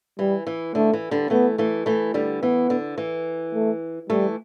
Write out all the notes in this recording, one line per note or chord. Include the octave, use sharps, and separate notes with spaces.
E3 G3
E3
D3 A3
E3
D3 G3
E3 A3 B3
E3 A3
E3 A3
D3 G3
E3 B3
D3
E3
A3
E3 G3 A3